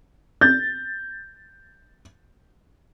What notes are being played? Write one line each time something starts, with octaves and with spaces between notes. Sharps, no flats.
G6 A6